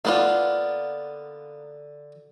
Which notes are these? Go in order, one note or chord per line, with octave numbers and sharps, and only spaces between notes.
D3 A#3 B3 D4 F4 D5